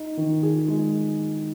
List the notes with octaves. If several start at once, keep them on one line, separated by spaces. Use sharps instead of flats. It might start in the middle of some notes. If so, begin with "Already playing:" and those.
Already playing: D#4
D#3
G#4
G#3